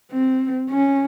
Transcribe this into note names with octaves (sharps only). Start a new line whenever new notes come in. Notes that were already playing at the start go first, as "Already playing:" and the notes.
C4
C#4